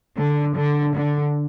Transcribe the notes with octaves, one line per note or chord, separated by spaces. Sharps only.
D3
D3
D3